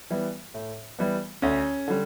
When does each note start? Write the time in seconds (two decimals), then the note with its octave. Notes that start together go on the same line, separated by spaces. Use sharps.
0.10 E3 G3 B3
0.54 A2
0.99 E3 G3 B3
1.42 D2 C#4
1.88 D3 G3